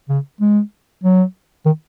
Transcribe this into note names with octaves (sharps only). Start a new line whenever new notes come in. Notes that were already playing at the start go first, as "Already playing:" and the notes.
C#3
G#3
F#3
D#3